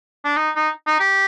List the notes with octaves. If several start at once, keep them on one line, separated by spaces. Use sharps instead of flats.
D4
D#4
D#4
D#4
G4